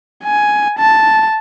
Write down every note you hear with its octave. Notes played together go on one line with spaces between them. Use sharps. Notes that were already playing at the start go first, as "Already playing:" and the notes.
G#5
A5